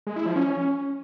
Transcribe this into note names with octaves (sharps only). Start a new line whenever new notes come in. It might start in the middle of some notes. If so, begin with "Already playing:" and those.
G#3
E4
F3
C#4